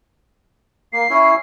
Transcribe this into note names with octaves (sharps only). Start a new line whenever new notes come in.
A#3 C7
C#4 E4